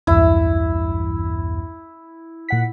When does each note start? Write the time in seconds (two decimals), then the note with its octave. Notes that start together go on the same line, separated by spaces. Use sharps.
0.07 B1 E2 G2 E4
2.49 A#2 F#5 B6